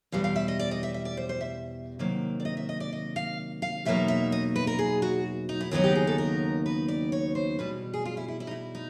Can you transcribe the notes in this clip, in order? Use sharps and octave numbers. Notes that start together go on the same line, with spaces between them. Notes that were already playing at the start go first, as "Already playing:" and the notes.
E2 B2 G3 F5
F5
E5
D#5
D5
D#5
E5
E5
D5
C5
C5
E5
C3 D#3 F#3 A#3
D5
D#5
E5
D#5
D5
D#5
F5
F5
E2 B2 F#3 A#3 D#4 E5
E5
D#5
B4
A#4
G#4
F#4
D#4
E4
D#2 C#3 F#3 B3 D#4 E4
G4
G#4
A4
A#4
B4
D5
C#5
C5
E2 B2 G3 B4
G#4
F4
E4
E4
E4
D#4
E4
D#4